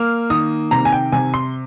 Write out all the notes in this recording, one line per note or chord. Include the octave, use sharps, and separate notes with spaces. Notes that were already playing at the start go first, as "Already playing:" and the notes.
Already playing: A#3 F6
D#3 D#6
C3 A#5
G#5
G5
C3 G#5
C6